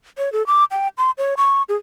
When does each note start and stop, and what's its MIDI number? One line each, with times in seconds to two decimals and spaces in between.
0.18 0.32 73
0.33 0.45 69
0.47 0.64 86
0.71 0.88 79
0.98 1.11 84
1.18 1.34 73
1.37 1.63 85
1.69 1.76 68